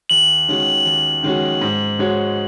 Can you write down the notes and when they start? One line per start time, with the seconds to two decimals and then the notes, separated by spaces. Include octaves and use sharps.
0.09 D#2 F#7
0.48 D#3 G#3 C#4 F#4
0.86 D#2
1.23 D#3 G#3 C#4 F#4
1.61 G#2
1.99 G#3 F#4 C#5